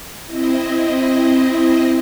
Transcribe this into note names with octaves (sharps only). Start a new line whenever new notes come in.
C4 E4 D#5